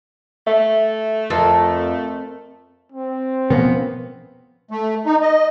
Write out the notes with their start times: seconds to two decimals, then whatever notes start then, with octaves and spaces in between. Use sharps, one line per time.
0.47 A3 E5
1.30 F2 A4 A#4
2.92 C4
3.50 B2 F3 A#3 B3 C#4
4.71 A3
5.06 D#4
5.22 D#5